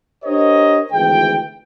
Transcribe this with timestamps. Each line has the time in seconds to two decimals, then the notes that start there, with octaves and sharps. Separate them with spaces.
0.25 D4 G4 A#4 C5 C#5 D#5
0.92 G#1 D2 E3 G#4 G5